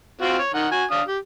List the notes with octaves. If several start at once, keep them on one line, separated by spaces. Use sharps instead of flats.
C4 F4 F#4
C#5
D#3 F#5
F#4 G#5
D4 F5 D#6
G4